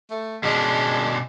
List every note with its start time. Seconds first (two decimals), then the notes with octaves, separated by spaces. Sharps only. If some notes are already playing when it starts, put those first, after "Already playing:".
0.10 A3
0.43 B2 G#3 C#4 D4